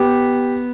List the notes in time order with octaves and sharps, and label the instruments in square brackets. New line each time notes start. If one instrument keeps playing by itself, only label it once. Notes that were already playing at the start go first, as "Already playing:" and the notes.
Already playing: [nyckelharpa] B3 [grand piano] G4